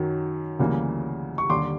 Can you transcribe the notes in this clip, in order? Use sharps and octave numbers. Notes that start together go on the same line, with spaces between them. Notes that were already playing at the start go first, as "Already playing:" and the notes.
Already playing: F#2 D#3 F#3
D2 C#3 E3 G3 A#3
C#6
D#2 D3 G3 C6 D6